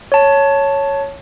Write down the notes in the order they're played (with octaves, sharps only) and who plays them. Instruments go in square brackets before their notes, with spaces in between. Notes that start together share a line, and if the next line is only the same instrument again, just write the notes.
[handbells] C#5 A5